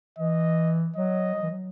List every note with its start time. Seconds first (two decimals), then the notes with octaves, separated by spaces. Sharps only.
0.18 E3 D#5
0.96 F#3 D#5
1.35 F#3
1.42 E3
1.51 F#3